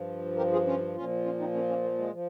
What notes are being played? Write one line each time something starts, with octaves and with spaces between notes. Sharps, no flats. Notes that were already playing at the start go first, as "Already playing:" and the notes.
Already playing: G2 F3
G4 A#4
F4 G#4
C#4 F4
A#2 F3 C#4 F4
C#4 F4
C4 D#4
A#3 C#4
A#3 C#4
A#3
G#3
F3